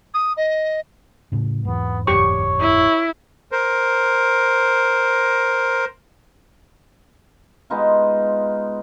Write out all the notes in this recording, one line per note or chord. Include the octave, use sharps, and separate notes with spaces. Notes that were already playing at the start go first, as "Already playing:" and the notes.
D#6
D#5
A2 C#3
E2 G#2 B3
F#1 E2 G#2 G4 C#5 C#6
E4
A#4 C5
G#3 B3 D#4 F4